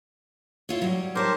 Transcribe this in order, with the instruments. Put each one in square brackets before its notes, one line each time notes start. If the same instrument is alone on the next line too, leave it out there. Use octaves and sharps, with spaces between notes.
[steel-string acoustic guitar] E4 F4 C#5
F#3 G3
[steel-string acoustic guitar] D#4 C#5 A5 [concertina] G4 A#4 C5